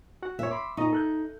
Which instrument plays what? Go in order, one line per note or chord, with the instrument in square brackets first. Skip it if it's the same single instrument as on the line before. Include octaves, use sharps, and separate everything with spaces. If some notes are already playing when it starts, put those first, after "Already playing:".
[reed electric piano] F#4 F#5
[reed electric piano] A#2 C#5 [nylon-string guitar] E5
[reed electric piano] B5 C6 D6
[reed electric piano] A#2 D#5 C#6 [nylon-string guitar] D#4
[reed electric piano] A4 F#6 G6